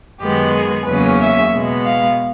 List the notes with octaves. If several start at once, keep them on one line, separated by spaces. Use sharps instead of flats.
F#2 D#3 G#3 B3 G4
G#4
E2 C#3 F#3 A#3 C#4 B4
E5
B2 G#3 B3
F5